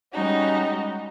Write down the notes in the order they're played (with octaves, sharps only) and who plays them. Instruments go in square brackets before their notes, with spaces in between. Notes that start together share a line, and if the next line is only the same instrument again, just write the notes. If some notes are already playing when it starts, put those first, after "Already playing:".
[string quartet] G3 G#3 C#4 D#4 F#4